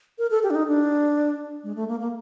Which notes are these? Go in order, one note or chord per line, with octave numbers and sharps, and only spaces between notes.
A#4
A4
G4
D4
D#4
D4
G#3
A3
A#3
A#3